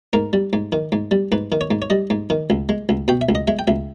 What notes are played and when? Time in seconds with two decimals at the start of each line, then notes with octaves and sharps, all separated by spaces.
0.13 G#2 A#4
0.33 G3
0.53 G#2
0.72 D#3
0.92 G#2
1.11 G3
1.32 G#2 B4
1.52 D#3
1.61 C#5
1.71 G#2
1.82 C#5
1.90 G3 D#5
2.10 G#2
2.30 D#3
2.50 C#2
2.69 G#3
2.89 C#2
3.08 B2 G5
3.21 E5
3.29 C#2
3.35 D#5
3.47 G#3 E5
3.59 G5
3.67 C#2 E5